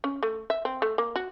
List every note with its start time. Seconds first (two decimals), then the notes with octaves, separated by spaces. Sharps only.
0.04 C#4
0.23 A3
0.50 E5
0.65 C4
0.82 A3
0.98 A#3
1.16 F#4